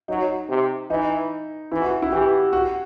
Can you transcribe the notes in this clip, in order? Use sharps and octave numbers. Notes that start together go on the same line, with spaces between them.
F#3 D#4
C3
E3 D#4
E3 E4
F#4
E4
E3 G4
F#4